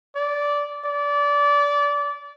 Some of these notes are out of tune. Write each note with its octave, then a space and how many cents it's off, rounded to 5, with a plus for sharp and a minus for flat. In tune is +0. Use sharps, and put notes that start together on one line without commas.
D5 -15
D5 -25